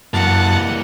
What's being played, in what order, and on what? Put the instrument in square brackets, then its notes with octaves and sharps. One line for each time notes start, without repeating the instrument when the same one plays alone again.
[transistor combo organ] F#2 A5 [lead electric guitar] E3 A#3 [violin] F#5